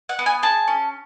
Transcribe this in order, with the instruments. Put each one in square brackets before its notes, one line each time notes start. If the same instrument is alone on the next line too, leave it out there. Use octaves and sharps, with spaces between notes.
[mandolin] F#5
B3
G#5
G#4 A5
C#4